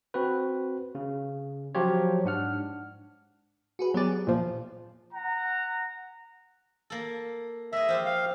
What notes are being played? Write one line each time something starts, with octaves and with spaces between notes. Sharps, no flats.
C4 F#4 B4
C#3
F3 F#3 F4 G4 C#5
G#2 D4 F#5 F6
F#4 G#4 B4
F#3 B3 G4 G#4 D5
A#2 F3
F#5 A#5
A#3 A4
G#3 D#5 E5
F3 G4 C5
F5